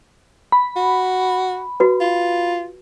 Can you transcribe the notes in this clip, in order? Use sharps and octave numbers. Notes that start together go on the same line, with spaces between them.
B5
F#4
F#4 B4
F4